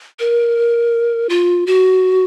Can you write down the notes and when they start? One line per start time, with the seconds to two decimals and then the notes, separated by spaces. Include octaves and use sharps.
0.19 A#4
1.29 F4
1.67 F#4